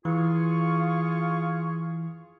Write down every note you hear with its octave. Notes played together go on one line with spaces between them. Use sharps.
E3 F4 G#4 C#6